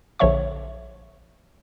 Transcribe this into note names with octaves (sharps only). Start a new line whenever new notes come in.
A#1 D3 F3 C#5 E5 C#6